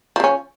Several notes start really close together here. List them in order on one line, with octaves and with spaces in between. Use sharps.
F3 C#3 C#4